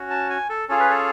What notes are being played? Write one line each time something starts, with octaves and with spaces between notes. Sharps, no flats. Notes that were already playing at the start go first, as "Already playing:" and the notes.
Already playing: C#4 F#4
A5
G#5
A4
C#4 F4 G#4 A4
B4
A4